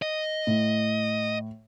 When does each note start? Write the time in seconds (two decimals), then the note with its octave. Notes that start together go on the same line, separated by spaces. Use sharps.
0.02 D#5
0.47 A2